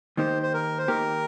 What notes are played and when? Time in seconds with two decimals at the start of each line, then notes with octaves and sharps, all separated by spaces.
0.17 D#3 A#3 D#4 G4 C5
0.43 C5
0.54 A#4
0.78 C5
0.88 D#3 A#3 D#4 G4 A#4